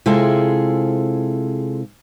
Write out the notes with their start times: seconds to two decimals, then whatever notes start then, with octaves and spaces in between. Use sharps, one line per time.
0.06 C3 G#3 E4 F4 G#4 A4